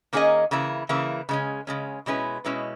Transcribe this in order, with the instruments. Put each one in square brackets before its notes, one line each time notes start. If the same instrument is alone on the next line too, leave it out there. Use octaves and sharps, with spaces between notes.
[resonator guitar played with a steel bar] D#3 A#3 C#4 G#4 D#5
C#3 E3 A#3 E4
C#3 E3 A#3 E4
C#3 G#3 C#4
C#3 G#3 C#4
B2 G#3 C#4 E4 B4
B2 G#3 C#4 E4 B4